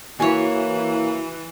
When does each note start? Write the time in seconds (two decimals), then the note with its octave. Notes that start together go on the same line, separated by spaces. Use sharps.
0.20 E3 A#3 E4 F#4 C#5 G#5